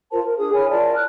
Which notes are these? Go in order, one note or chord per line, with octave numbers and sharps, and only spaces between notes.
F4 A#4 C5 A5
A#4
D4 G#4 D#6
E4 C#5 G#5 F6
F4 A#4 D5 A5
F6 F#6